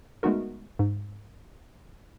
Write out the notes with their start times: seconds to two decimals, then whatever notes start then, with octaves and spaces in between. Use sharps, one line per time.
0.23 G#3 A3 B3 D#4 F#4 A#4
0.79 G#2